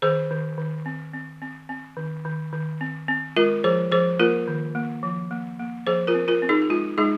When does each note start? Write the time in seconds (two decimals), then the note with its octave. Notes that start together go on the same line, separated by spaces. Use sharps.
0.02 D#3 G#4 C5
0.31 D#3
0.58 D#3
0.86 C4
1.14 C4
1.42 C4
1.69 C4
1.97 D#3
2.25 D#3
2.53 D#3
2.81 C4
3.08 C4
3.36 G#3 F4 A#4
3.64 F3 G#4 C5
3.92 F3 G#4 C5
4.19 A#3 F4 A#4
4.48 D#3
4.75 A#3
5.03 F3
5.31 A#3
5.59 A#3
5.87 F3 G#4 C5
6.07 F4 A#4
6.14 C4
6.28 F4 A#4
6.42 C4
6.49 D#4 G#4
6.62 G#4
6.70 G#3 F4
6.98 G#3 D#4 G#4